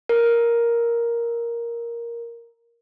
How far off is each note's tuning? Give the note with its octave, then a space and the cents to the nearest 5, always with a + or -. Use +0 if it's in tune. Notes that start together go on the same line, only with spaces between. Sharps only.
A#4 +5